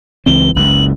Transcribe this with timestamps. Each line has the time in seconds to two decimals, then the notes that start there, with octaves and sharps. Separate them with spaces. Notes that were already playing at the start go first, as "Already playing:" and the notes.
0.26 C#2 E3 C4 G7
0.56 F#1 C#2 F#7